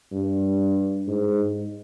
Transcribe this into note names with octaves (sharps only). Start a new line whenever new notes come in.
G2
G#2